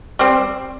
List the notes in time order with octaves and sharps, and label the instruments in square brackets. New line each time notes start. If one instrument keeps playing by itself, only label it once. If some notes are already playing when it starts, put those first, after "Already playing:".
[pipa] G3 C4